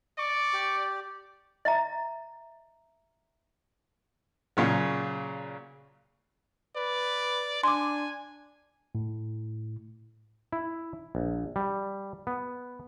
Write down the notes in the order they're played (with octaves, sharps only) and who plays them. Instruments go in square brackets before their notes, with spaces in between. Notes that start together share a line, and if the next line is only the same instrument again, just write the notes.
[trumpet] D5 [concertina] C#6 D6
[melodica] G4
[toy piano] D#5 E5 A#5
[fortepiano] A#2 C#3 F#3
[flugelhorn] B4 [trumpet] D5
[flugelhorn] D4 [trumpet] G#5 [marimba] C6 D6
[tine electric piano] A2
[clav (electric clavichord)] E4
A#1
G3
B3